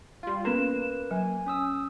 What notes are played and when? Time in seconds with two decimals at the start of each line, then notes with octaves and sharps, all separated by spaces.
0.23 G3 F4 C6
0.45 A#3 B3 C#4 A4 B4 E7
1.11 F#3 G#5
1.46 C#4 D#6 E6